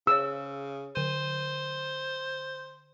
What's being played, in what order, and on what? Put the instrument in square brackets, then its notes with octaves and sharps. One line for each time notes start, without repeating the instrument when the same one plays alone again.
[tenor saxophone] C#3 [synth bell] G#4 C#5 [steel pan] E6
[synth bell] D3 D#7 [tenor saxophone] C5